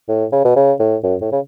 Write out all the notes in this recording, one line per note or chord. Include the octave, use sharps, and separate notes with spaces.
A2
C#3
B2
C#3
A2
F#2
A2
C#3